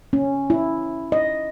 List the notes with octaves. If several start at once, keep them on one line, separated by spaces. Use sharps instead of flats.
C#4
E4
D#5